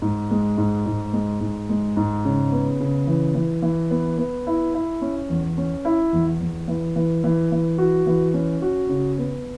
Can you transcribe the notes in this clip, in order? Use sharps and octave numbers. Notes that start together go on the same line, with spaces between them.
G#2
G#3
G#2
G#2
G#3
G#2
G#3
G#2
C#3
B3
C#3
E3
E3
E3
B3
B3
E4
E4
C#4
E2
C#4
E4
E2
E2
E3
E3
E3
E3
F#4
E3
C#4
F#4
C#3
B3